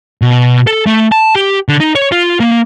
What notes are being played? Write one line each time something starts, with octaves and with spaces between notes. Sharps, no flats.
B2
A4
A3
A5
G4
D3
D#4
C#5
F4
A#3